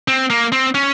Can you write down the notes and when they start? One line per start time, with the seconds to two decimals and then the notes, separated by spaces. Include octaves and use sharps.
0.08 C4
0.30 A#3
0.52 C4
0.75 C#4